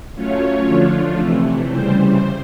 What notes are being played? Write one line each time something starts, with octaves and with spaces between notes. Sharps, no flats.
F#3 A3 C#4 F4 C#5
D3 F3 A3 D4 F4
C3 E3 A3
C#3 E3 G3 C5